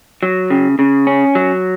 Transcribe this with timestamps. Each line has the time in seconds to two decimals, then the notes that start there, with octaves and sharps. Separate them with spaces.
0.23 F#3
0.50 C#3
0.79 C#3
1.07 C#4
1.35 F#3